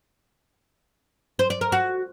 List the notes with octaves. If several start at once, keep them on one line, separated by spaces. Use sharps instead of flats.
C5
D5
A#4
F#4